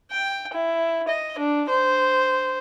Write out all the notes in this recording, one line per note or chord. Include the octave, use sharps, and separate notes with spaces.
G5
E4
D#5
D4
C5